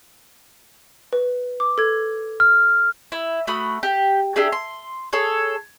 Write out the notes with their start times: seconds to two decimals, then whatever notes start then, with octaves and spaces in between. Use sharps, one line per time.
1.13 B4
1.60 D6
1.78 A4 G#6
2.40 F6
3.12 E4
3.47 A3 F#4 B5 D#6
3.83 G4
4.36 D4 E4 G4 G#4
4.52 C6
5.13 G#4 A4 C#5